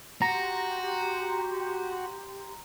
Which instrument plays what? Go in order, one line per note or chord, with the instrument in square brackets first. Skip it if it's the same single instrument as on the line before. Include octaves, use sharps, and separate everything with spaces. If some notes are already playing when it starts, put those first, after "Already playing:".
[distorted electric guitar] F#4 [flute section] G4 C6 [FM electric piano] A#5